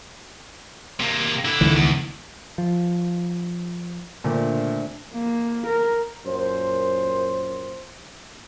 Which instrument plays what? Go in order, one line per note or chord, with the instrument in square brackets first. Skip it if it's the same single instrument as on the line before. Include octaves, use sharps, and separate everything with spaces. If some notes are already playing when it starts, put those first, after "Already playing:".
[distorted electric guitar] C3 A#3
D3 E4
[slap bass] C#2 D#3 E3
[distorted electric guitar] E2
[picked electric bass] F3
[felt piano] A#2 [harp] D3 A3 C4
[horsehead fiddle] A#3
A#4
[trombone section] F#2 A#2 C5